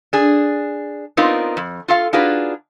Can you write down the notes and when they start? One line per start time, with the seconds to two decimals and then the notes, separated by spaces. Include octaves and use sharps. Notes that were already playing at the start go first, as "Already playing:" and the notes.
0.13 D4 G#4
1.17 B3 C4 D4 D#4 F4 A#4
1.57 F2
1.88 F4 A4 F5
2.13 D4 D#4 F4 F#4 G#4 B4